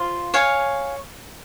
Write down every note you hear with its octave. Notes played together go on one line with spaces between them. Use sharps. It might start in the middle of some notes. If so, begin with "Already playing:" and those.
Already playing: F4 C5 F5
C#5 F5 G#5